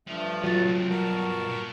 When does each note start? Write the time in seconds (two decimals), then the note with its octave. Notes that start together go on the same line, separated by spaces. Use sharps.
0.08 G2 F3 A3
0.44 F#3 B3 D#4 F4 A6
0.65 C#2 C4
0.89 G2 B2 F#4 A#4 A5
1.47 A#2